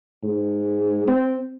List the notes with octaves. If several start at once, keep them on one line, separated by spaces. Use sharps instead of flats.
G#2
C4